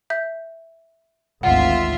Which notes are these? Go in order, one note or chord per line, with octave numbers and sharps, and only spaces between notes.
E5 G6
G#1 D2 F4 E5 F#5